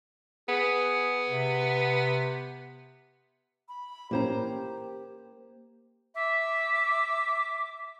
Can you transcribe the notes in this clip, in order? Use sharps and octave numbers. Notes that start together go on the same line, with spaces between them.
B3 G#4
C3
B5
A#2 E3 A#3 C#4 G4 C5 A#5
E5 D6